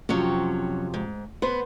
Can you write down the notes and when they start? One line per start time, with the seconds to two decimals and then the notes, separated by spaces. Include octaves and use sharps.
0.09 F2 C3 F#3 C#4
0.94 G#2
1.42 B3 B4 C5